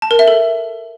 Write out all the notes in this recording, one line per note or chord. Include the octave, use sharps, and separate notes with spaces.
A5
A#4
E5
A4